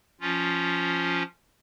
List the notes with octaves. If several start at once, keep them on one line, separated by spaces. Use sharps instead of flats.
F3 C#4 F4